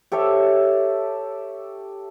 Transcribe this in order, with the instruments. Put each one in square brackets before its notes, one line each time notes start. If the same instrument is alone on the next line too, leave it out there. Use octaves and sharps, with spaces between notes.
[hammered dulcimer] G4 A4 C#5 E5